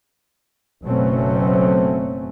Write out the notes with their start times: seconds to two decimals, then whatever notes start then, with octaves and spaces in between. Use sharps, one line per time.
0.83 F#1 B2 F#3 A3 C4 C#4